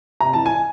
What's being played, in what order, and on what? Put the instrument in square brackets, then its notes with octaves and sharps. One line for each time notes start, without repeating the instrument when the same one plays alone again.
[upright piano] C3 A#5
E3 A5
G#5